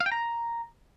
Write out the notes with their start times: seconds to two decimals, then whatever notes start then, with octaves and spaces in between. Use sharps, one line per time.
0.01 F5
0.06 G5
0.12 A#5